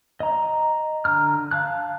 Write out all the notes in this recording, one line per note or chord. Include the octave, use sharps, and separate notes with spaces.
D#5 A#5
D3 A#5 F6
F5 A5 F#6